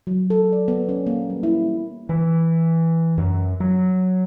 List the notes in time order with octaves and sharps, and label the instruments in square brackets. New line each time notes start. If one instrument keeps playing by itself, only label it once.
[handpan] F#3
A4
D5
B3
C#4
A#3
G3
E4
[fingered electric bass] E3
F#2
F#3